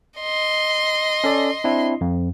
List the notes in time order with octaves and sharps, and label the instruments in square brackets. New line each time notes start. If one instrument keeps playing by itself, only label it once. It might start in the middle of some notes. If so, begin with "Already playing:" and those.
[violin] D#5 C6
[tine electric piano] C#4 A4 D5
C4 D4 E4
F2